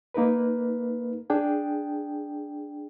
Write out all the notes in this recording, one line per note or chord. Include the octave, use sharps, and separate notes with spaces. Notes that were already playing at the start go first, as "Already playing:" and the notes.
A#3 D#4 A#4 B4
D4 G#4 G5